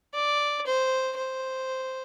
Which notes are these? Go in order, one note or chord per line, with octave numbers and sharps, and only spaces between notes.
D5
C5
C5